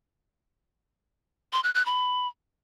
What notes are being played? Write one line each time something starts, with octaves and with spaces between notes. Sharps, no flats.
C6
F#6
F#6
B5